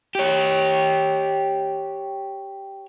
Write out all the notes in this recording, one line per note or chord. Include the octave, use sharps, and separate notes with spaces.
G4 C#5